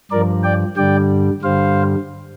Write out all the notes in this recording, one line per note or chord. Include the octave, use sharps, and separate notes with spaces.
G2 F3 A#4 D5
D5 G5
G2 D3 G3 D5 G5
G2 D3 G3 C5 F5